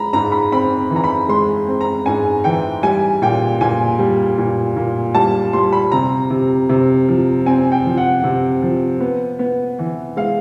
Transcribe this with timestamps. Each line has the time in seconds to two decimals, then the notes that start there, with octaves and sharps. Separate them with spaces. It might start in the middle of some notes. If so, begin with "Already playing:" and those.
Already playing: G#3 A#5 B5
0.13 G#2 A#5
0.32 B5
0.52 C4 B5
0.90 E3
0.96 A#5
1.04 B5
1.29 G#3 C6
1.67 C4
1.81 A#5
2.06 G#2 G#5
2.44 E3 G5
2.83 G3 G#5
3.22 A#2 G5
3.61 A#2 G#5
3.99 G3
4.38 A#2
4.76 A#2
5.15 G3 A5
5.53 G3 C6
5.73 B5
5.92 C3 A#5
6.30 C3
6.69 C3
7.08 F3
7.46 C4 G#5
7.72 G5
7.85 F3
7.97 F#5
8.24 C3
8.62 F3
9.00 B3
9.39 B3
9.79 E3
10.17 G#3 F5